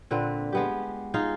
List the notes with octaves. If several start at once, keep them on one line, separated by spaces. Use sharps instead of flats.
A#2 D3 C4 B4
G#3 B3 G4
D#4 F4 G#4 F5